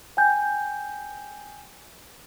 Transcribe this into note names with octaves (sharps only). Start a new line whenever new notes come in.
G5 G#5 G6